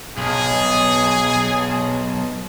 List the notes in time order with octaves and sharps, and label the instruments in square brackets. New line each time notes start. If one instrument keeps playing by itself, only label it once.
[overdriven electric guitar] B1 [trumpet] G#4